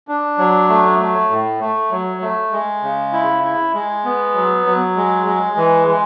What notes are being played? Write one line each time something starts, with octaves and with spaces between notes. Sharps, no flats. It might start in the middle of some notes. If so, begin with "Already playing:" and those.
D4
F#3
A3
A3
A2
A3
F#3
A3
G#3
C#3
E4
E4
G#3
B3
F#3
F#3
G#3
G#3
E3
G#3